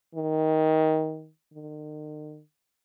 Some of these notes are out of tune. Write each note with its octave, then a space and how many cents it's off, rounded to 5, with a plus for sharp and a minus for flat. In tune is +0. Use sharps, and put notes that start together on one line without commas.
D#3 +15
D#3 -40